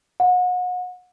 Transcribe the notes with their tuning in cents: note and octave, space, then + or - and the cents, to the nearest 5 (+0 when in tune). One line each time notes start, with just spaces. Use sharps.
F#5 -35